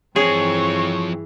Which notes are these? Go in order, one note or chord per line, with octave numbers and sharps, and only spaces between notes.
G2 E3 F3 C4 G#4 C#5